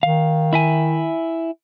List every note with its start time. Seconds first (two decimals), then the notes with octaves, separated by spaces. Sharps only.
0.03 D#3 F5
0.53 E4 E5 G#5